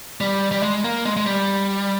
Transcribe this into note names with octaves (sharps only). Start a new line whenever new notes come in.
G3
G3
G#3
A#3
G#3
G#3
G3